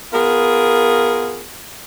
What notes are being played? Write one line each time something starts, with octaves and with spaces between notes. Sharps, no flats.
B3 F4 G#4 A#4